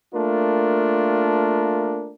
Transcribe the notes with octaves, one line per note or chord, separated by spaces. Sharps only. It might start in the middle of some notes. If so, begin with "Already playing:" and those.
A3 A#3 D4 F4 A#4